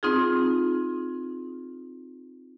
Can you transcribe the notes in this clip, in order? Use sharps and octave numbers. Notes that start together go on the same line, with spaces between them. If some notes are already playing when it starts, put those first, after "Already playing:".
C4 D#4 F4 G#4